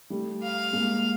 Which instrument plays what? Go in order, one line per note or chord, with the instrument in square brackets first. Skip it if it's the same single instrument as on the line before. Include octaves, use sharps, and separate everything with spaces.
[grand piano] G3 A3
[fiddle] F5
[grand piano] G#3 A#3